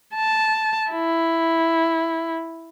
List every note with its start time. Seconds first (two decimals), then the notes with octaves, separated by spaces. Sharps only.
0.15 A5
0.91 E4